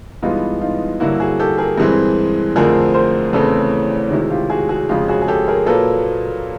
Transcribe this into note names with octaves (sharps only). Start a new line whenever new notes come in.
G2 E3 G#3 B3 D#4 F4
D#4 F4
G2 D3 F#3 A#3 E4 F#4
F#4 G#4
G4 A4
G#4 A#4
G2 E3 G#3 C4
F2 D3 F3 A3 C4 G#4 A#4
A#4 C5
E2 C#3 E3 A3 C4 A4 B4
C3 D#3 G#3 E4 F#4
F4 G4
F#4 G#4
F#4 G#4
F2 C#3 F3 G#3 F4 G4
F#4 G#4
G#4
G4 A4
G#4 A#4
A#2 F#3 A#3 A4 B4